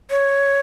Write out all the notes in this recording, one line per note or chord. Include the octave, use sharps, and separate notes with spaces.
C#5